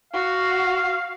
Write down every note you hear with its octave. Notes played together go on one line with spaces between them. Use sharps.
F#4 F5